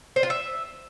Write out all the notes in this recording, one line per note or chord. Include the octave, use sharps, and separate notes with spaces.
C5
F4
E5